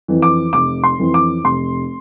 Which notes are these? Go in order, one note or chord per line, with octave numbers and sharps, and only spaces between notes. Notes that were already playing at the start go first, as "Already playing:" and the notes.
F2 E3
D6
F1 D6
C6
F2 E3
D6
F1 C6